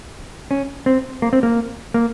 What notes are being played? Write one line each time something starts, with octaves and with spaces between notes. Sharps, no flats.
C#4
C4
A#3
C4
A#3
A#3